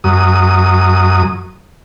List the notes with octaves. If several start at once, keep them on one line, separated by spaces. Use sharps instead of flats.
F#2 D#6